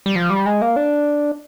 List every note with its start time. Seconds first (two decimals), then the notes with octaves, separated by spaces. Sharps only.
0.06 G3
0.16 F3
0.30 G3
0.46 G#3
0.61 A#3
0.76 D4